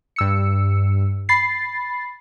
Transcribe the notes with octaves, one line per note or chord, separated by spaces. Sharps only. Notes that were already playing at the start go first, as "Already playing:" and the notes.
G2 E6 C#7
B5 A6 C7